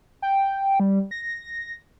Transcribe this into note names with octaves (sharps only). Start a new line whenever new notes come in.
G5
G3
A#6